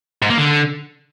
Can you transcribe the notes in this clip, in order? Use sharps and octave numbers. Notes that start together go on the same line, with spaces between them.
G#2
A#3
D3